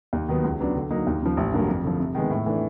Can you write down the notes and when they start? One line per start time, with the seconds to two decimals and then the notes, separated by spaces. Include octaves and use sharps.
0.13 D#2
0.29 D#3 F#3 B3
0.44 C#2
0.60 C#3 F#3 B3 D4
0.75 D3
0.91 F#3 A#3 D#4
1.07 D#2
1.22 C#3 F3
1.37 A1
1.53 G2 D3 F#3 A#3
1.68 F2
1.83 D3 F3
2.00 C3
2.15 D#3 G#3 B3
2.30 A2
2.46 E3 A3 D4